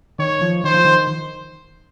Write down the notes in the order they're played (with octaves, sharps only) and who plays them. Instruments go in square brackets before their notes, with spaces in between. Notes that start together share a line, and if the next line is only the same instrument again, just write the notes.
[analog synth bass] D#3 [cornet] C#5
[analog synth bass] F3
[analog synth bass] D#3 [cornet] C5
[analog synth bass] F3
D#3